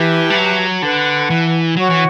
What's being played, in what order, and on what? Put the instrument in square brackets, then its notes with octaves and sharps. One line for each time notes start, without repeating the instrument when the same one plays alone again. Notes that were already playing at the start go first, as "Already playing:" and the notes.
Already playing: [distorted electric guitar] E3 [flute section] G4 B4 E5 A5
[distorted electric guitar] G3
F#3
[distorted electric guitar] D3 [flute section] B4 F#5 A5
[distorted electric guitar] E3
[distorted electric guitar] F#3 [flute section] F#4 C#5 F#5 C#6
[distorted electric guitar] E3